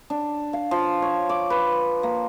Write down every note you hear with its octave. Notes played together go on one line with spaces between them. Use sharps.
D4
F5
F3
C#5
D6
B4
A#3